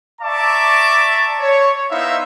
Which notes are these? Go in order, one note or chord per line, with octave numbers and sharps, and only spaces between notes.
D5 E5 A5 A#5 C#6 D6
C#5
B3 D#4 E4 C5 E5 F5